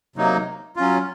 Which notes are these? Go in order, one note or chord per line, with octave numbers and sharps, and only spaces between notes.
C3 F#3 A#3 D#4
F#3 C#4 F4